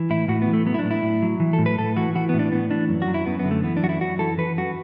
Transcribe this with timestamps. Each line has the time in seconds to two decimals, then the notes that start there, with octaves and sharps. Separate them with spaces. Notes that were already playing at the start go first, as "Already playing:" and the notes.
Already playing: E3
0.10 A2 E4
0.28 A2 F#4
0.42 B3
0.47 E3
0.53 A3
0.65 F#3 B3
0.74 E4
0.79 D4
0.85 A2
0.91 E4
1.03 A2
1.22 F#3
1.40 E3
1.53 A4
1.59 A2
1.66 B4
1.78 A2 A4
1.96 E3 F#4
2.15 E3 F#4
2.29 A2 B3
2.39 D4
2.52 A2 B3
2.71 E3 D4
2.89 F#2
3.02 F#4
3.08 F#3
3.14 E4
3.26 F#2 B3
3.39 B3
3.45 D3
3.51 A3
3.63 E3 B3
3.77 D4
3.83 F#2 F#4
3.89 E4
4.01 F#2 F#4
4.19 E3 A4
4.38 E3 B4
4.57 F#2 F#4